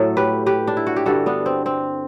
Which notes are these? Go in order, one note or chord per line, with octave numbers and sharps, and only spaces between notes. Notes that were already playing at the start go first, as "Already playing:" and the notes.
Already playing: A2 F#3 A3 A4
G4 B4
G4 B4
D4
E4
F#4
G4
G2 D3 G3 F#4 A4
B3 D4
C4
C4